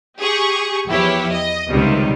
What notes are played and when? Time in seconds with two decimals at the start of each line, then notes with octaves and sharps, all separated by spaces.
0.19 G4 G#4 C#6
0.89 E2 F3 E4 G4 C#5
1.31 D#5
1.68 C#2 C3 D#3 G3